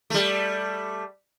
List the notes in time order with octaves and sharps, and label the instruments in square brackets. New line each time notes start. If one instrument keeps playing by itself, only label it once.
[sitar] G3 A3